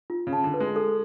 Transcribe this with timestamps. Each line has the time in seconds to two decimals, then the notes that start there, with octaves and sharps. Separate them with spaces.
0.10 F4
0.27 C#3
0.33 A5
0.44 D3
0.54 B4
0.60 G#3
0.76 A4